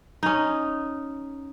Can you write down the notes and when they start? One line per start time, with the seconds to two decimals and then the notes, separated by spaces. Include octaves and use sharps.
0.23 C#4 D#4